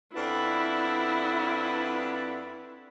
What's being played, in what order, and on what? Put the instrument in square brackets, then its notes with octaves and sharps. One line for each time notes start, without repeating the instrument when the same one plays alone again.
[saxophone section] F2 B3 D4 [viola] E4